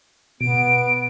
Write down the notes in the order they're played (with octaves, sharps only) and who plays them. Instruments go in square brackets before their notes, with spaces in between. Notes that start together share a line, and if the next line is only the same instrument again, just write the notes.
[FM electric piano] B2 [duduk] B3 [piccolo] D7